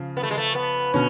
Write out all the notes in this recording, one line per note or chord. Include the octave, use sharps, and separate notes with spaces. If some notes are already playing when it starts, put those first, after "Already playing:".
Already playing: C#3 F3
B3
A3
G#3
A3
B3
B2 D3 C#4